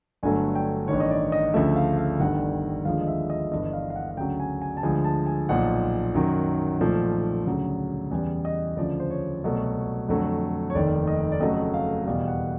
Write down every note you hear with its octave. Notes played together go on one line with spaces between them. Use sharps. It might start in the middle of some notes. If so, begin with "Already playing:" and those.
G1 G2 D3 F#3 A3 G#5
G5
A1 G2 D#3 C#5
D#5
D5
D#5
D2 C#3 F3 A3 E5
F5
F5
G1 G2 D#3 G3 F#5
D#2 D3 F3 G#3 F5
D#5
E5
D#5
G1 G2 E3 D#5
F5
F5
F#5
F#5
D2 C#3 F#3 G5
G#5
G#5
A5
D2 D3 F3 G#3 G#5
A5
G#5
B1 A#2 F3 F#5
F#2 D#3 F#3
B1 A#2 F3 A3
D2 C#3 F#3
E2 C#3 E3 G3 G#5
D#5
D2 C#3 F3 D5
C5
C#5
C2 B2 F#3 A3
F2 D3 F#3 A3
C#5
F1 D#2 D#3 D5
D#5
D5
F2 C#3 F#3 A3 D#5
F5
E2 B2 G3 F5
F#5